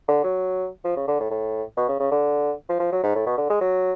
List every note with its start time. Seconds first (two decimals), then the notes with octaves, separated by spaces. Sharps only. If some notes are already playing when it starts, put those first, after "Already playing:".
0.08 D3
0.24 F#3
0.85 F3
0.96 C#3
1.08 D3
1.20 A2
1.31 A2
1.77 B2
1.89 C#3
1.99 C#3
2.11 D3
2.69 F3
2.80 F3
2.92 F#3
3.03 G#2
3.15 A2
3.26 B2
3.37 D3
3.50 G#3
3.61 F#3